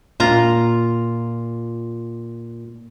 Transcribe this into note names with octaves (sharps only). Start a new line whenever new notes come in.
A#2 F4 A#5